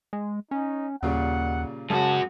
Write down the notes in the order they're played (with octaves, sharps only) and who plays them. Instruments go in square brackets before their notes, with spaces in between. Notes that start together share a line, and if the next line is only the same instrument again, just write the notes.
[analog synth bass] G#3
[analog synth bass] C#4 [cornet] D#4
[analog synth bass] D#2 [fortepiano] A#2 C#3 G3 [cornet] F#5
[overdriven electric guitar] F#2 F#4 [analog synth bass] C#3 [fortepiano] G#3 [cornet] A5